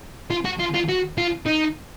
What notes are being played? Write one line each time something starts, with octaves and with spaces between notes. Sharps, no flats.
F4
F#4
F4
F4
F#4
F4
D#4